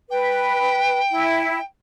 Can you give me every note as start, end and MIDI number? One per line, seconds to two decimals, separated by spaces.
0.10 1.01 71
0.10 1.64 79
1.11 1.58 64